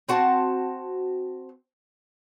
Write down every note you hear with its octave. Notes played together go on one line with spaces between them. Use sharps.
C4 F#4 A5